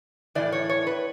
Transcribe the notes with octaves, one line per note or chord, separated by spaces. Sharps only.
A2 E3 D5
C#5
C#5
B4